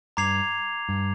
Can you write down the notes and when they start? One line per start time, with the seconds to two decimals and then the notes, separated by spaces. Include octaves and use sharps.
0.17 G2 A#5 D6 G#6 C7 F7
0.89 G2